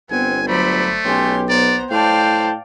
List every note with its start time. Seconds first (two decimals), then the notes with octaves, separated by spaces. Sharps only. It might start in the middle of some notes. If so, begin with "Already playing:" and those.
0.10 G1 B3 C4 G#5
0.47 F#3 A3 C5 D5 B5
1.05 B1 C#4 G4 C6
1.49 B3 C5 D5 A#5
1.91 A2 C5 D5 F5 G5 A5